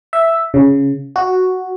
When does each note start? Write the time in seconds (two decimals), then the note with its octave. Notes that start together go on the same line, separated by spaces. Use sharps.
0.13 E5
0.54 C#3
1.16 F#4